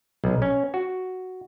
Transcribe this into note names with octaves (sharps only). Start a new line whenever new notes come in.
B1
C#4
F#4